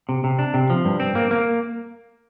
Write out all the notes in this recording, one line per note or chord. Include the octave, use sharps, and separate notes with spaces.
C3
C3
D4
C3
F3
G2
C4
A#3
A#3